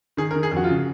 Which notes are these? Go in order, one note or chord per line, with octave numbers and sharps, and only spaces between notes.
D#3 G#4
A#4
D#3
G#4
F2
F#4
F4
C#3